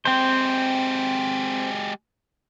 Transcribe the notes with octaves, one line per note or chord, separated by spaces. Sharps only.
G#3 C4 G4 C5